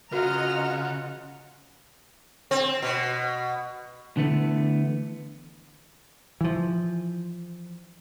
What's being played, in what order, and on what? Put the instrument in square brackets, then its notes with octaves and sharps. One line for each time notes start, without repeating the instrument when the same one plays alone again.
[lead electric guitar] C#3 [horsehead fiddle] F4 F#5 [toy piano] F#4 B4 [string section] D#5 A#5 F6
[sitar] C4
B2
[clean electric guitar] D3 E3 A3 B3
[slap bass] E3 F3